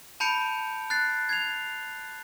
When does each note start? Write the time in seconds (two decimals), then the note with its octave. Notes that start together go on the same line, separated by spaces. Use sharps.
0.20 A5 B5 G6 C#7 D7 F7
0.90 F#6 A6 C7
1.29 G#6 C7 F7